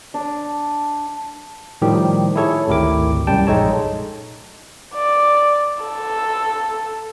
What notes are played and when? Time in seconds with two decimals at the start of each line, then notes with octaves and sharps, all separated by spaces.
0.14 D4
1.82 A2 D#3 F3 G3 G4
2.36 E4 G#4 A4 C#5
2.68 G#1 D2 E4 G4 A#4 D6
3.27 C2 F#2 G3 G5 A5
3.47 A#1 G#3 D#4 A4 C#5 A5
4.94 D5
5.84 A4